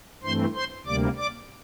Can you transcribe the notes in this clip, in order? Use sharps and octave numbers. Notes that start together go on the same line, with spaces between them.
G2 E3 A3 C4 C5 C6
C5 C6
D2 C3 G3 A#3 D5 D6
D5 D6